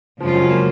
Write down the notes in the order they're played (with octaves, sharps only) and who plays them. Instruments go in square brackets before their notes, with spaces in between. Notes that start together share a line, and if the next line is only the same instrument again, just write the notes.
[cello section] F#2 C#3 G#3 C#4 F4 [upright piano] F3
[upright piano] F#3
A#3